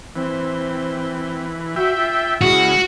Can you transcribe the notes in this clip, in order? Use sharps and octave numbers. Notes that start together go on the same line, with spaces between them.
E3 C4
F#4 E5 G5
F4
C#3 G#3 E4 F#4